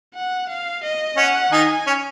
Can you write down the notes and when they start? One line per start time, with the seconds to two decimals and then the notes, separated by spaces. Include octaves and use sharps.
0.14 F#5
0.49 F5
0.83 D#5
1.17 C#4 F#5
1.52 D#3 D#4 G#5
1.87 C#4